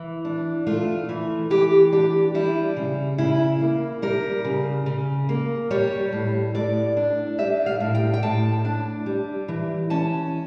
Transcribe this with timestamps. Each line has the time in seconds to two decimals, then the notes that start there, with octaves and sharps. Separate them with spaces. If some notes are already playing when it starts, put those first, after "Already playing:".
Already playing: E3
0.25 D4
0.67 A3 F4
1.09 E3
1.50 E3 G4
1.92 D4 G4
2.35 G3 E4
2.76 C#3
3.18 C#3 E4
3.61 A#3
4.02 G3 A#4
4.44 C#3
4.86 C#3
5.29 A#3
5.71 G3 C#5
6.13 A2
6.55 A2 D5
6.97 D4
7.38 G3 E5
7.66 F5
7.80 A2
7.95 G5
8.14 G5
8.23 A2 A5
8.65 D4
9.06 G3
9.48 E3
9.90 C#4 A5